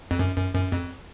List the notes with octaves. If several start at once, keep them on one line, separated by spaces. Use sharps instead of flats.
F2
F#2
F#2
F#2
F2